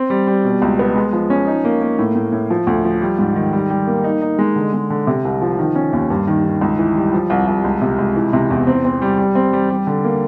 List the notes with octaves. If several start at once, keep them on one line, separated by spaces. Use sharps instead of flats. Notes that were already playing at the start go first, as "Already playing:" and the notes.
Already playing: C4
G3
G3
B2
C#2
B3
G#3
F3
C#4
D#4
A#3
A#3
A2
A2
A2
F3
D2
F3
G3
G#2
D#3
G3
G3
A#3
D#4
D#4
G#3
D3
G#3
D3
C3
C2
F3
D#3
C#4
D#2
G2
D#3
D#3
C#2
E3
G3
F3
C2
C2
C#2
C3
C#2
E3
C3
E2
C4
C4
G3
G3
C4
G3
G3
D3
A#3